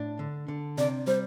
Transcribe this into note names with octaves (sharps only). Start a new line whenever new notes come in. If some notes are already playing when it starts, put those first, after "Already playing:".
Already playing: A2 D4
D3
D3
C3 D5
G3 C5